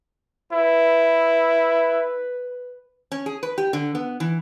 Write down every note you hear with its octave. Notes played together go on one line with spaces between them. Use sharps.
E4 B4
C#4
G#4
B4
G4
D3
B3
E3